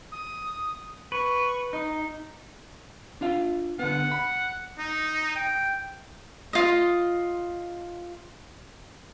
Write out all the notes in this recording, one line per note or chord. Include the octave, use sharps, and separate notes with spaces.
D#6
B4 C#6
D#4 D#5
D4 F4 F5
D3 B3 F#5
B5
D#4
G5
F4 D#5